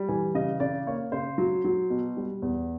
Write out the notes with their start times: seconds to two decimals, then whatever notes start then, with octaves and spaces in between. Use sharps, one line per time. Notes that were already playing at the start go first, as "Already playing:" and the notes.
Already playing: G3
0.08 E3 G#5
0.34 C#3 D#5
0.60 C#3 D5
0.87 A#3 C#5
1.12 C#3 C5
1.38 F#3
1.65 F#3
1.90 B2
2.17 G3
2.42 E2